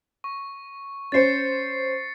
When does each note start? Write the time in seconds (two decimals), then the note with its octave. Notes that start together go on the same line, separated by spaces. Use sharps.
0.24 C#6
1.12 C#4 C5 A6 C7 C#7